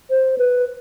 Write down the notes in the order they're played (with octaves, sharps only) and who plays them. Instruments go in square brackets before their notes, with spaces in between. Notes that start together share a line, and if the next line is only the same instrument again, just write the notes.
[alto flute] C5
B4